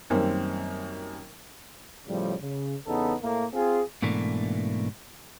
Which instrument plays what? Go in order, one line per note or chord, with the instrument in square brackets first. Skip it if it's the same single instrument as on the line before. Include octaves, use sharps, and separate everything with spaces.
[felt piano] F#2 D#3 G3 A#3 C4
[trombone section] A2 C#3 F3 G3
C#3
E2 C#3 B3 D#4 A4
A2 A3 A#3
C4 F4 G#4
[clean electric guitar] G#2 B2 E3 A3 A#3 D4